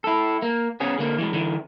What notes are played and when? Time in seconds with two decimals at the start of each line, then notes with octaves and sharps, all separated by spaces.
0.04 E4 A4
0.42 A#3
0.80 B3 C#4 G#4
0.99 D3 A#3
1.18 E3 F3 G#3
1.33 D3 E3